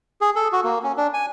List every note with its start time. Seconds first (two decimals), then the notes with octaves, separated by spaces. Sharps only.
0.21 G#4
0.36 A4
0.52 F#4
0.64 A#3
0.83 C#4
0.97 D4
1.14 G#5